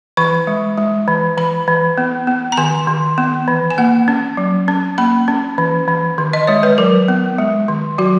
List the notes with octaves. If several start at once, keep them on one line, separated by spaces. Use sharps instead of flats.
E3 C#6
G#3
G#3
E3
E3 B5
E3
B3
B3
A#5
D#3 G#5
D#3
B3
E3
G#5
A#3 F#5
C#4
F#3
C#4
A#3 B5
C#4
E3
E3
D#3
D#5
G#3 C#5
B4
F#3 A#4
B3
G#3
D#3
F#3 F#4